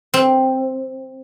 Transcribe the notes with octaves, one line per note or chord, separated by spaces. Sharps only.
C4